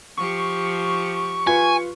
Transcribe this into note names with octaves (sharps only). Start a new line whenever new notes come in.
F3 G4 C#6
F4 B4 G#5